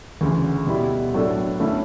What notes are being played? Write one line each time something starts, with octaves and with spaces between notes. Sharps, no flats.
D2 C#3 E3
B2 G3 B3 E4
A2 F#3 A3 D4 A4
D3 A3 C#4 E4 A4